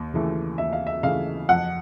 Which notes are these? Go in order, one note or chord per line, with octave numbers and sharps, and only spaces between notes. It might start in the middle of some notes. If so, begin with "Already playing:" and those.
Already playing: D#2
C#3 E3 A3
D#2 E5
F5
E5
C#3 E3 A3 F5
F2 F#5